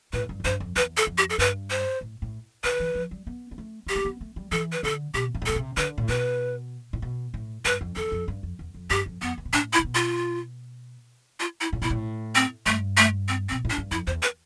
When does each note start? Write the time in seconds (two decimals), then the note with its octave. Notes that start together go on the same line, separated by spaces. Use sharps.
0.13 A2 B4
0.29 G2
0.40 F2
0.45 G2 C5
0.60 F2
0.76 E2 B4
0.97 A4
1.07 F2
1.18 G4
1.30 A4
1.38 G2 B4
1.70 C5
2.01 A2
2.22 A2
2.64 D3 B4
2.80 E3
2.95 F3
3.11 G3
3.27 B3
3.51 B3
3.58 A3
3.86 G3 G4
3.96 A3
4.05 B3
4.21 A3
4.36 G3
4.51 E3 A4
4.72 B4
4.83 D3 A4
5.14 B2 G4
5.34 G2
5.42 A2
5.46 B2 A4
5.56 C3
5.77 D3 B4
5.98 A2
6.08 B2 B4
6.93 A2
7.02 B2
7.34 A2
7.65 G2 B4
7.81 F2
7.96 E2 A4
8.12 F2
8.28 G2
8.43 F2
8.59 E2
8.74 F2
8.90 G2 G4
9.06 F2
9.22 F2 B3
9.37 E2
9.45 B2
9.53 A2 D4
9.73 E4
9.79 C3
9.84 B2
9.95 F4
11.40 F4
11.61 E4
11.73 A2
11.82 B2 E4
11.90 A2
12.35 C4
12.66 G2 A3
12.97 A3
13.28 C4
13.49 C4
13.52 B2
13.65 A2
13.70 D4
13.78 G2
13.91 F2 E4
14.07 E2 C5
14.23 B4